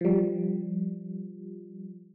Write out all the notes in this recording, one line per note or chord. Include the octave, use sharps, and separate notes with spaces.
F3 G3